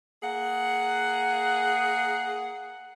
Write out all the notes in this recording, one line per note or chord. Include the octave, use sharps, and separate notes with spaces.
A#3 G#4 F#5